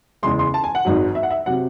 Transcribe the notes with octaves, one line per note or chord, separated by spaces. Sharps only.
E2 C#3 G#3 C6
C6
A5
G#5
F#5
G#1 G#2 F#3
E5
F#5
E5
C3 F#3 F#5